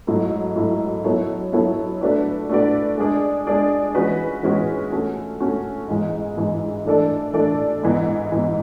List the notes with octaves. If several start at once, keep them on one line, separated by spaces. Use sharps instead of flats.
G#2 F#3 A3 E4
G#2 F#3 A3 E4
F#3 B3 E4 A4 C#5
F#3 B3 E4 A4 C#5
A3 D4 F#4 B4 D5
A3 D4 F#4 B4 D5
G#3 D4 G#4 D5
G#3 D4 G#4 D5
E3 G#3 C#4 F#4 B4
E3 G#3 C#4 F#4 B4
A3 C#4 F#4
A3 C#4 F#4
G#2 E3 G#3
G#2 E3 G#3
E3 A3 D4 A4 D5
E3 A3 D4 A4 D5
G#2 E3 B3
G#2 E3 B3